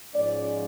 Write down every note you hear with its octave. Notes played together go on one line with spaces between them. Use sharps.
G#2 F3 G#3 C#4 D5